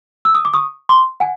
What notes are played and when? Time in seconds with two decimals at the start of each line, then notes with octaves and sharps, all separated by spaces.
0.25 E6
0.35 D#6
0.45 D6
0.54 C#6 D#6
0.89 C6 D6
1.20 F#5 G#5